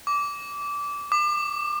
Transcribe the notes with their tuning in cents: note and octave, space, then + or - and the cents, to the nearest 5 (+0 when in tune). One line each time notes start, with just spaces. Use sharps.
D6 -20
D6 +35